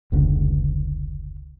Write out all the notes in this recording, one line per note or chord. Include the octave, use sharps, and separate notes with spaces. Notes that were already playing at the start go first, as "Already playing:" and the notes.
F1 C#2 D3